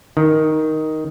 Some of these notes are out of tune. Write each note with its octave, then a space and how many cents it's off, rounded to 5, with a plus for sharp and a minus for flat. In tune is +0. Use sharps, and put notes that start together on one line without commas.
D#3 +5